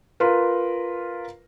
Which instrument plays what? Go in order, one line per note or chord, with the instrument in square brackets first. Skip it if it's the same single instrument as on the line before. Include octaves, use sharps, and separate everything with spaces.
[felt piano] F4 A#4 B4